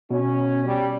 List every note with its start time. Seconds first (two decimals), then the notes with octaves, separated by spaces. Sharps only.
0.11 B2 C#4
0.65 G3